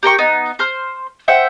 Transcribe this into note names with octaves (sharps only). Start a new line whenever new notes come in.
G4 A#4 G5 C#6
B3 D#4
C5 C6 F6
C5 E5 F#5 G5